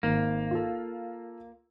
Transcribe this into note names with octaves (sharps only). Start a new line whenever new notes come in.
G#1 A#3
F4 A4